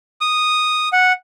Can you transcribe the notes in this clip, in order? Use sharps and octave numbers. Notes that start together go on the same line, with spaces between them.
D#6
F#5